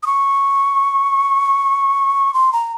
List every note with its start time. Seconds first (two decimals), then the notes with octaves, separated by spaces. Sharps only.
0.03 D#6
0.06 C#6
2.34 C6
2.53 A#5